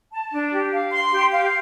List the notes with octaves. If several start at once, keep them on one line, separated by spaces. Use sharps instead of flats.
A5
D4
G4
F5
C6
G4
F5